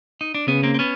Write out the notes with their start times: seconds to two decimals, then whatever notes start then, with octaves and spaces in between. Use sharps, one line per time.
0.21 D#4
0.35 D4
0.48 C#3 B3 C#4
0.63 A#3 C4
0.74 C4
0.79 B3 C#4